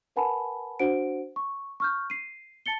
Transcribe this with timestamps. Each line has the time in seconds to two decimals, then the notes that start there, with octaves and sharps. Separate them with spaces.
0.16 A#4 B4 F#5 G#5 A5 B5
0.80 D4 F#4 C5 F#5 D7
1.36 C#6
1.80 C#6 F6 G6
2.10 C7 D#7
2.66 A5 A6 C#7 G7